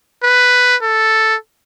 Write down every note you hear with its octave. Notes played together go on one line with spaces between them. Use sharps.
B4
A4